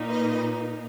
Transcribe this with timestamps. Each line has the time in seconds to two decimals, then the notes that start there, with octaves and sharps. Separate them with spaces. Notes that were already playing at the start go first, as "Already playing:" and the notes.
Already playing: A#2 A#3 D#4
0.09 B4 D#5